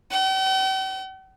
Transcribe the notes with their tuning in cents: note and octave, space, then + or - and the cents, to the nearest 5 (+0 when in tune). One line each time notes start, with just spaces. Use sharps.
G5 -45